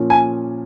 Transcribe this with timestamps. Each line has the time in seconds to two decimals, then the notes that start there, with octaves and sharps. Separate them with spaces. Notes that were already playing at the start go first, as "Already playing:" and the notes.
Already playing: A#2 F3 C#4
0.10 G#5